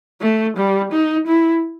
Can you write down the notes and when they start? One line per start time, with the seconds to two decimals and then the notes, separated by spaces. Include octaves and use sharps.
0.22 A3
0.57 G3
0.92 D#4
1.27 E4